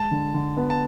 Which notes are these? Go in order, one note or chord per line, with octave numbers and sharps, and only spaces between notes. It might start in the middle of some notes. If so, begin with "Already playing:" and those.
Already playing: G#3 A5
D3
D3
B3
A5